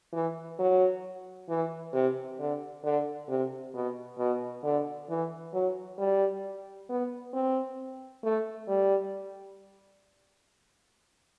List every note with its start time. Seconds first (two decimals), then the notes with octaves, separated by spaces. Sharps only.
0.13 E3
0.59 F#3
1.49 E3
1.93 C3
2.39 D3
2.84 D3
3.29 C3
3.74 B2
4.18 B2
4.64 D3
5.09 E3
5.53 F#3
5.98 G3
6.89 B3
7.34 C4
8.24 A3
8.68 G3